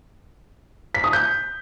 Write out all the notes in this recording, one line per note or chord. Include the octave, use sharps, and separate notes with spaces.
B6
D#6
G6